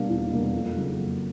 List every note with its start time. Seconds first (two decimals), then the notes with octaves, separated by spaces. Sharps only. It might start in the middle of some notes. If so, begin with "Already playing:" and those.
Already playing: B2 G3 A#3 D4 F5
0.09 E2
0.31 B2 G3 A#3 D4
0.53 F2
0.75 C#3 F#3 A#3
0.97 F2